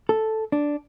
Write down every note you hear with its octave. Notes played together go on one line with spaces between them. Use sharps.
A4
D4